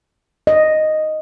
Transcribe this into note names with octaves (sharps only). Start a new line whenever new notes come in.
D#5